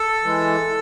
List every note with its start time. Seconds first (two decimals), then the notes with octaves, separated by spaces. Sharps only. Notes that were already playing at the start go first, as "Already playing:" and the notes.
Already playing: A4
0.24 E3 G#3